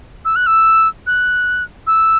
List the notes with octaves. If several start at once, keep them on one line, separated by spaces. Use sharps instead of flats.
E6
F#6
E6
F#6
E6